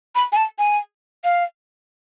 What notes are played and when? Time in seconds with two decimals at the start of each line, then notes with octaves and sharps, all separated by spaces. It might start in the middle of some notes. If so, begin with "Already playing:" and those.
0.15 B5
0.32 G#5
0.37 A5
0.59 G#5
1.24 F5